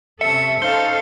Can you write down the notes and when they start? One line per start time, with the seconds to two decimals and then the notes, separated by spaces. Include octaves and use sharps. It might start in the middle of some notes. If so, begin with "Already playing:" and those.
0.21 C3 C#4 A4 E5 C#7
0.62 C#4 D#4 A4 C5 F5 G7